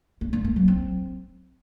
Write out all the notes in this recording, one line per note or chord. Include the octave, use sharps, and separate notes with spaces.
A#3
A#3
A#3
F#3
C4